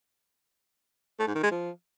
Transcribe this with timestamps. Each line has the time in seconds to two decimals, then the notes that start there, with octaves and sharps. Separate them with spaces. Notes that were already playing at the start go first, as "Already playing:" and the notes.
1.19 A3
1.27 G#2
1.35 D#3
1.43 G#3
1.51 F3